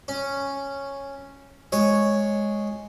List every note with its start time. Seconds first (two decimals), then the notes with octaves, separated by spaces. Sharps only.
0.08 C#4
1.72 G#3 C#5